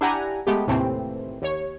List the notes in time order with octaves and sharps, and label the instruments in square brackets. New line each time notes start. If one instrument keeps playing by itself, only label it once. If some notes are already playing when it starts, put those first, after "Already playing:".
[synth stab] D4 E4 G4 F#5 G#5 A#5
G#3 A3 B3 G4
D#2 A2 C3 E3 A3 C4
D#2 C#5